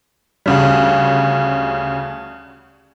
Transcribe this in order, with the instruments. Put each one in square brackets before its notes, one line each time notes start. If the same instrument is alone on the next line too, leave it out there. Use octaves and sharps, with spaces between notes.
[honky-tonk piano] D2 C#3 G3